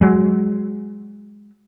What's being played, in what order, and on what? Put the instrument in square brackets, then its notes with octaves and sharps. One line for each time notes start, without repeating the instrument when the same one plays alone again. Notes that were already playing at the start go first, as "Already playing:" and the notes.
[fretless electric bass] F#3 G#3